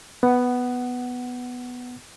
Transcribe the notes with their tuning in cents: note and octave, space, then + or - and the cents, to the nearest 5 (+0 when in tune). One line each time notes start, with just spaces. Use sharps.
B3 +0 F#5 +15